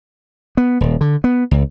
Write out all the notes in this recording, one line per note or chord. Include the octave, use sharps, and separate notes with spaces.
B3
D#1
D3
B3
C#2